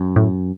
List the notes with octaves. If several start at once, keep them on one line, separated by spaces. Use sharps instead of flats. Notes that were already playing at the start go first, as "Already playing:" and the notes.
Already playing: F#2
A2